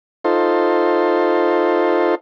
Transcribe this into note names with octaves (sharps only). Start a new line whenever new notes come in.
D#4 F4 A4 C5